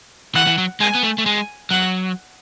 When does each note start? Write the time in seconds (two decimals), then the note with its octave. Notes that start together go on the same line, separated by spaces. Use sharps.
0.35 E3 F#5
0.47 E3
0.58 F#3
0.80 G#3 G#5
0.95 B3
1.03 A3
1.18 A3
1.26 G#3 G#5
1.71 F#3 F#5